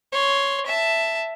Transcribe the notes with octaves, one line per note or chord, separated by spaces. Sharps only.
C#5 C6
E5 A5